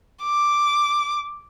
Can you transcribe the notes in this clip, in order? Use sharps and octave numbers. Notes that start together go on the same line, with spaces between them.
D6